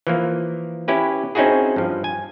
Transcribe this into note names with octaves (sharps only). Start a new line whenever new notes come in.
E3 F3 A#3
C#4 E4 G4 B4
C4 C#4 D#4 E4 F#4 G#4
G2 F3
G#5